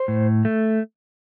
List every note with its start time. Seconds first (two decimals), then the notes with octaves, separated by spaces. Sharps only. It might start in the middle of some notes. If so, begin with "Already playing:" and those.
Already playing: C5
0.08 A2
0.45 A3